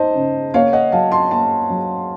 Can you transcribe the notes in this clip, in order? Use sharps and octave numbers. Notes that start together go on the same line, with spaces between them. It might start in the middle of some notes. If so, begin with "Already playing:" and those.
Already playing: D#4 C5 D#5 A5
C#3
A#3 C#5 F5
D#5 F#5
F#3 F5 A5
A5 C6
A#3 A5 C6
F#3